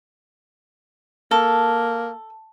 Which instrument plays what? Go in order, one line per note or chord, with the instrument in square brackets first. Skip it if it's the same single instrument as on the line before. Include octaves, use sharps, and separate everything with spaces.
[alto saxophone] A#3 [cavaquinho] A4